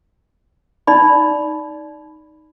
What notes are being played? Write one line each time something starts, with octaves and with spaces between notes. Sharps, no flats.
D#4 D5 B5